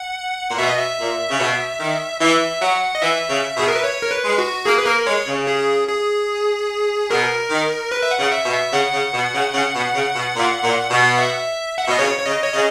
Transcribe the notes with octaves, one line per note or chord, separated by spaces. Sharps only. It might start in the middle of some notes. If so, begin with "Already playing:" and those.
Already playing: F#5
A#2
B2 E5
D#5
E5
A#2
C#3
B2
D#3
E3 E5
F#3 F#5
D#5
E3 E5
C#3
B2 G#4
A#4
B4
C#5
A#4
B4
G#3
F#4
A#3 G#4
B4
A#3 A#4
G#3 C#5
C#3
G#4
G#4
B2 A#4
D#3
B4
E5
F#5
C#3
E5
B2
E5
C#3 F#5
C#3
B2
C#3
C#3
B2
C#3
B2
A#2
A#2
B2
E5
F#5
E5
B2 D#5
C#3 C#5
C#5
C#3 D#5
C#5
C#3 D#5